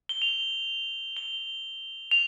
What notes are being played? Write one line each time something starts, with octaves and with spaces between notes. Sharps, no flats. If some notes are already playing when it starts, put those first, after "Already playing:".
G7
F7
G7
F7